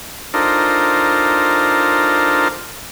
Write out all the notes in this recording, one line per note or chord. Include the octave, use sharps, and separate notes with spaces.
D4 D#4 F4 A4 A#4 C5